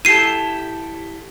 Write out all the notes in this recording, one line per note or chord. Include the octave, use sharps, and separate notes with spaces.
E4 G4 A4 C7 D#7